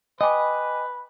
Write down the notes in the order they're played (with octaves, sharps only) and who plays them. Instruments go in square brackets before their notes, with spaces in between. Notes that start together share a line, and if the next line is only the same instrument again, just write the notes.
[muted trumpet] B4 [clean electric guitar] D#5 [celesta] G5 G#5 D6